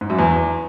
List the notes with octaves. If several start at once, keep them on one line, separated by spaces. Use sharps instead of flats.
G#2
F#2
E2